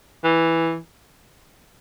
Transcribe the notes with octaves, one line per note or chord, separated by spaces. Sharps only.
E3